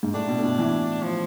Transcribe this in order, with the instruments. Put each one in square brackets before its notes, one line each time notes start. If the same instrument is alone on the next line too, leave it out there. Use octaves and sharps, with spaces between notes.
[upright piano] G#2
[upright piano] A2 [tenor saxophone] D4
[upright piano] B2
A2
B2
E3
[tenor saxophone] F3